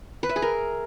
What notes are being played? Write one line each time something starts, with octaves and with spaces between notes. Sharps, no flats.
B4
E5
G#4
A#4